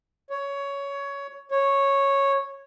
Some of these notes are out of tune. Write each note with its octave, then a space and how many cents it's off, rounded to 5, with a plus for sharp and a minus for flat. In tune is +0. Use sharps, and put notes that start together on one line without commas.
C#5 +15
C#5 -5